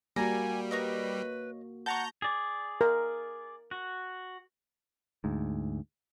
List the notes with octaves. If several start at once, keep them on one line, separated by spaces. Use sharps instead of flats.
G3 A#3 F#4 G#5 A#5
A#4 B4 C#5 D#5
F#5 A5 A#5 C#6 G6
G#4 D5
A#4
F#4
D2 G#2